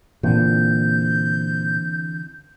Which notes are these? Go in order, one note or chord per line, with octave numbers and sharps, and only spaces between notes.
A#2 D3 E3 C4 G6